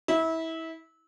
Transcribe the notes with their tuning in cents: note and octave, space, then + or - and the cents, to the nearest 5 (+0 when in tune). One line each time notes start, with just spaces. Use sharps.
E4 -25